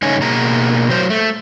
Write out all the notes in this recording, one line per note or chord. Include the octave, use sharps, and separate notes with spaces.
G2 C#3 A3 D#4 C#5 G#5
B2 A#3 G#4 A#5
F#3 C5
A3